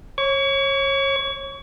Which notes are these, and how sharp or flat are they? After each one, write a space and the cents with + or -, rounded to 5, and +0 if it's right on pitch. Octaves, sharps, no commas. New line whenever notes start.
C#5 -25 C#6 +35